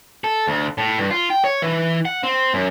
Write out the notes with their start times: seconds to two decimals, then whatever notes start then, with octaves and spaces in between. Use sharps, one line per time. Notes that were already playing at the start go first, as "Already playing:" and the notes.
0.24 A4
0.47 D2
0.78 A2
0.98 G2
1.11 F4
1.30 G5
1.44 C#5
1.62 E3
2.05 F#5
2.23 C4
2.54 F#2